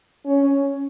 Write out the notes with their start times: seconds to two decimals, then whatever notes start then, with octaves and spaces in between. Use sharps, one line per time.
0.26 C#4